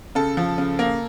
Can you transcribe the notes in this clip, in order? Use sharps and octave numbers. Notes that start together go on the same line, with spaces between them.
C#3 A4
F3
C#3
A#3